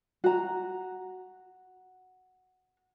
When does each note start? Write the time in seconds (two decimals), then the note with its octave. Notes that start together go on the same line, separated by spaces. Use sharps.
0.24 F#4 A#5